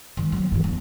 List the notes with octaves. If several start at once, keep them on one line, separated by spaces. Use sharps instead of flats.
D#3 G#3
F#3 A#3
G2 E3
E2